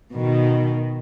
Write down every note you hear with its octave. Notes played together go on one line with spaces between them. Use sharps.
B2 D#3